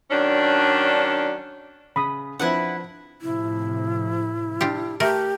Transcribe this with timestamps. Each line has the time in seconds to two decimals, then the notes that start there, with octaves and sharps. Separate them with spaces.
0.11 D#3 F#3 C#4 D4
1.96 C#3 B5 D#6
2.40 F3 C4 D4 E4 B4 F#5
3.22 A2 C3 F3 E4
4.61 D4 F4 G4
5.00 A3 G4 A#4